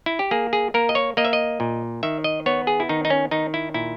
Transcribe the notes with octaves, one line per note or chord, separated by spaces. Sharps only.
E4
G4
A#3 G#4
G#4
A#3 A#4
D#5
C#5
A#3 D#5
E5
D#5
A#2
D#3 E5
D#5
B3 C#5
G#4
E4
D#3 D#4
D#4
C#4
D#3 D#4
E4
A#2 E4